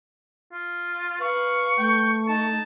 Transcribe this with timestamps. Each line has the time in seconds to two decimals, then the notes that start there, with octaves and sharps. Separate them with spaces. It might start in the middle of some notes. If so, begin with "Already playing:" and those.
0.52 F4
1.21 B4 F5 C#6
1.78 A3 G5
2.28 D#4 A5